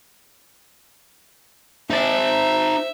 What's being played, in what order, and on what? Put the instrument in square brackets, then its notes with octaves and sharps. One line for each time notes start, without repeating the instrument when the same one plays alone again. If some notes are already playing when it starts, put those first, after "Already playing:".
[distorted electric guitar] D#4 A5 [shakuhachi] C5 [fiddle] E5